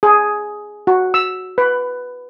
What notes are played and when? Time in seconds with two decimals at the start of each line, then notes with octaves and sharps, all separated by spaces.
0.03 G#4
0.87 F#4
1.14 E6
1.58 B4